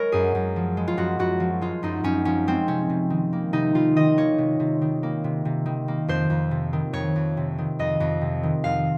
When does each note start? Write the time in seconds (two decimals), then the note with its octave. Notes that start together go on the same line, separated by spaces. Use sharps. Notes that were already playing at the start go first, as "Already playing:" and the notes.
Already playing: G#3 A#4 C#5
0.12 F#2 G#4
0.35 F#2
0.56 F3
0.77 G#3
0.88 F4
0.97 F#2 F#4
1.19 F#2 F#4
1.40 F3
1.61 G#3 F4
1.83 F#2 D#4
2.04 F#2 C#4
2.25 F3 C#4
2.47 G#3 C4
2.68 C3 C#4
2.89 C3
3.10 D#3
3.33 A#3
3.53 C3 D#4
3.75 C3 F4
3.96 D#3 D#5
4.17 A#3 C#5
4.38 C3
4.60 C3
4.81 D#3
5.03 A#3
5.24 C3
5.45 C3
5.66 D#3
5.88 A#3
6.08 F2 C5
6.30 F2
6.51 C3
6.73 D#3
6.93 F2 C#5
7.16 F2
7.37 C3
7.58 D#3
7.79 F2 D#5
8.00 F2
8.21 C3
8.43 D#3
8.64 F2 F5